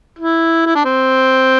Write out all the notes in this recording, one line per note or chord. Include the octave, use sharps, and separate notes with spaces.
E4
E4
D4
C4